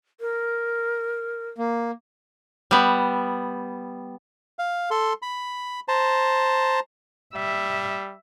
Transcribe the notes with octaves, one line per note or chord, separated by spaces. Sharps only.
A#4
A#3
G3 B3
F5
A4 C6
B5
C5 A5 A#5
G3 E5